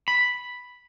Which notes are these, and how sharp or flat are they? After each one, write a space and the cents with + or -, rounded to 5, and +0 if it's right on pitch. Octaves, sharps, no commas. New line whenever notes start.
B5 +0